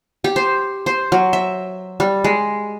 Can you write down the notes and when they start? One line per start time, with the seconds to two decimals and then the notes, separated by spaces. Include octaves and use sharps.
0.24 G4
0.36 C5
0.86 C5
1.12 F#3
1.33 E5
2.00 G3
2.24 G#3